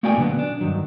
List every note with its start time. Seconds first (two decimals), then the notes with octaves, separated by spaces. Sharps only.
0.03 A3 A#3 F#4 D5 G5 G#5
0.17 B2 D3 F#3 B3
0.39 D4
0.61 G2 D#3 F#3